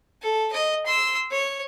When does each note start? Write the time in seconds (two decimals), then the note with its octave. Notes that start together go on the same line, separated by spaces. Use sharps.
0.22 A4
0.53 D#5
0.86 C6 E6
1.31 C#5